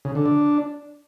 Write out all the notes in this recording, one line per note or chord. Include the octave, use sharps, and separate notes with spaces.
C#3
D3
D4